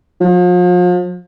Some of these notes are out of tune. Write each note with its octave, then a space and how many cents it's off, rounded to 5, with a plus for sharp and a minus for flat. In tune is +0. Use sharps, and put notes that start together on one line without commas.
F3 +40